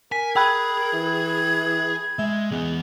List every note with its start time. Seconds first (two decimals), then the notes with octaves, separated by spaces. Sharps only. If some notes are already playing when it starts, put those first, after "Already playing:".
0.12 A#4 G#5 B6
0.36 G#4 G5 B5 F#6 G#6
0.93 E3
2.19 G#3 E5
2.51 E2 G#3 B3